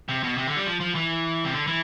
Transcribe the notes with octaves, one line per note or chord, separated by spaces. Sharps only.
C3
B2
C3
D3
G3
F3
F3
E3
C3
D3
E3